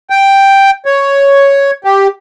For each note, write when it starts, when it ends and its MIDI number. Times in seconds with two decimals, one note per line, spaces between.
0.10 0.71 79
0.86 1.71 73
1.84 2.07 67